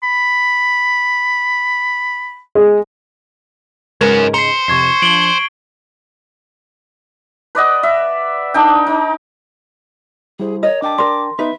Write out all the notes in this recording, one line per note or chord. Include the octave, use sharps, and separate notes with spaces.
B5
G#3
G#2 C#3 F#3 G#3 C#4 A#4 B4
C5 A#5 C7 C#7
F2 C3 C#6 G#6 C7
F3 D4 D7 F#7 G7
B4 D5 D#5 F#5
E5
D4 D#4 G5
D#4
G3 E4 G#4 C5
A#4 C#5 D#5
D4 G5 A5 D6
A#4 D5 C6
B3 D#4 B4 E5